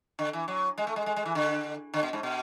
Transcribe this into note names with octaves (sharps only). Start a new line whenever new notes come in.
D3
E3
F#3
G#3
A3
G#3
G#3
G#3
E3
D3
D3
B2
G#2
B2